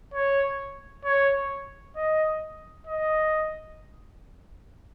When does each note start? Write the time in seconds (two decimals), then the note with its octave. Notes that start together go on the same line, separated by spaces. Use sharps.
0.14 C#5
1.05 C#5
1.96 D#5
2.87 D#5